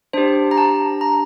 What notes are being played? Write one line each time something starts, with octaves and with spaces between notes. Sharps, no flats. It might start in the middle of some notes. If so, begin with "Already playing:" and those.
D4 G4 C5
A#5
A5
A#5